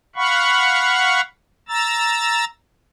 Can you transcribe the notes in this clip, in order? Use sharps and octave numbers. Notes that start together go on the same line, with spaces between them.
F5 F#5 B5 C#6
A#5 E6 A6